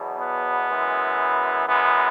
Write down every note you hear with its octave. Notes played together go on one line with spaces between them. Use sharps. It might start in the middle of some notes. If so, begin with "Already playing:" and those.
Already playing: E2 B2 F#3
B3
F#2 E3 G#3
F#2 E3 G#3 B3